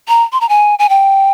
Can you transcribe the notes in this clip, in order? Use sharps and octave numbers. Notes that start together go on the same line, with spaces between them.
A#5
C6
A#5
G#5
G#5
G5